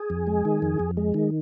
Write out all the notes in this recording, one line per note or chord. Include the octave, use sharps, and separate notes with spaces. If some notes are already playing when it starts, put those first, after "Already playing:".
Already playing: G#4
F2
G#3
D#3
F2
F2
G#3
D#3